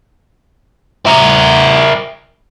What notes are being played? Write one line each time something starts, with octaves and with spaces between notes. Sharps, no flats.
E4 A#4